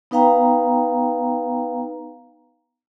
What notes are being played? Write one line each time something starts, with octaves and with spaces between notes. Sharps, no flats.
B3 D#4 B4 F5 G5 A#5